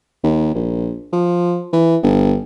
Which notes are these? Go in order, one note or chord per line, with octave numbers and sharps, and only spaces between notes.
D#2
A#1
F3
E3
G1